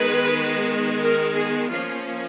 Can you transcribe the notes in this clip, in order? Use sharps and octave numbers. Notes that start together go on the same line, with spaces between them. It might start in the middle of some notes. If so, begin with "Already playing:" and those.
Already playing: D#3 G#3 B3 B4
A#4
G#4
F3 A#3 C#4 F4